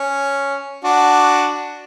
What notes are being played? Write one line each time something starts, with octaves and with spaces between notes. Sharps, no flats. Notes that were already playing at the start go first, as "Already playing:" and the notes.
Already playing: C#4
D4 F#4